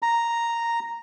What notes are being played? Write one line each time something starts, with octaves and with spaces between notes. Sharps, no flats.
A#5